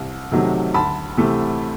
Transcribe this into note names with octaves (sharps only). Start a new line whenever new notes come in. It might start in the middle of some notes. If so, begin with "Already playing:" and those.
Already playing: C2
C3 D#3 F#3 A3
D2 A5 B5
C3 E3 A3